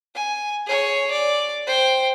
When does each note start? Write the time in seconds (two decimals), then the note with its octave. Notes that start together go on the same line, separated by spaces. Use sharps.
0.15 G#5
0.66 G#4 C#5
1.11 D5
1.67 C5 G5